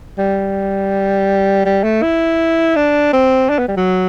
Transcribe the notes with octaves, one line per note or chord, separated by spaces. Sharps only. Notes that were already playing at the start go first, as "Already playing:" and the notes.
G3
G3
A3
E4
D4
C4
D4
B3
G3
F#3